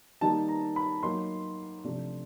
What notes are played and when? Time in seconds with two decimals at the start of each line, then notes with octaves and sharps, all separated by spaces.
0.21 D#3 G3 A#3 D#4 A5
0.48 A#5
0.76 B5
1.03 F#3 A#3 D#4 C6
1.84 C3 F3 A3 D4